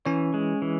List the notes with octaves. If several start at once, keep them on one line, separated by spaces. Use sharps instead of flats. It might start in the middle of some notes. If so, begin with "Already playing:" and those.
E3 C#4 C#5
G#3
E3